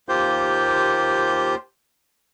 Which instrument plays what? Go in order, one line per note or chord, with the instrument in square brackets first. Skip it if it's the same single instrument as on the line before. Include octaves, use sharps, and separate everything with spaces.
[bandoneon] D#2 A#3 F4 G4 C5 G6